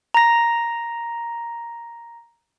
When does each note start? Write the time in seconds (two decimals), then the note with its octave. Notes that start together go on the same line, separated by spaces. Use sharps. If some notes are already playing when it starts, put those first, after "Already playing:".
0.14 A#5 A#6